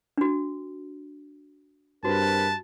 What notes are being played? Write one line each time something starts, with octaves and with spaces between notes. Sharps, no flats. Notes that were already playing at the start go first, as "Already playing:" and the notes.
D4 F#4
G2 C4 F#4 A#4 B4 A5